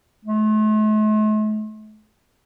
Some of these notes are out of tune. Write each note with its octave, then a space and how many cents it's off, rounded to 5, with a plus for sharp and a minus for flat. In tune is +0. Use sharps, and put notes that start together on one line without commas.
A3 -45